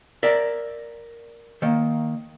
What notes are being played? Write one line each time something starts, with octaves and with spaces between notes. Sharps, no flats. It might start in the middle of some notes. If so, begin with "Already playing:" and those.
A#4 D5 E5
D#3 A#3